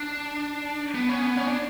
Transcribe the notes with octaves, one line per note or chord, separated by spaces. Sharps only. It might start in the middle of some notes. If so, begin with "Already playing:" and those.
Already playing: D4
B3
C#4
B3
C#4
D4